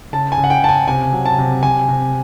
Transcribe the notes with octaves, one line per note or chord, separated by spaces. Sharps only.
C#3 A5
G#5
C#3
F#5
G5
C#3 A5
G#5
C3 G#5
F#3
A5
C3
C3 G#5
C3